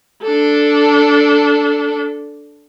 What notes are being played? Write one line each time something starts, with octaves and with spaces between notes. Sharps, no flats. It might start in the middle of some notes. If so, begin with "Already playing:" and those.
D4 A4